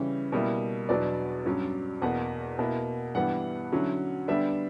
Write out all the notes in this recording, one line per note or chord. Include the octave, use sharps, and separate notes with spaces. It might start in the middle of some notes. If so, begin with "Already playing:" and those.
Already playing: C#3 E3 G3 C#4 E4
B2 G3 A#3 E4
E2 B2 F#3 B3 D4 D5
G2 F#3 C#4
E2 B2 A#3 F#5
B2 A#3 E4
G2 E3 G3 B3 F#5
D3 F#3 C#4 E4
D3 G3 B3 D4 E5